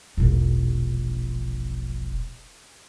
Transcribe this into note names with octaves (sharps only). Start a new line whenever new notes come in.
E1 A#1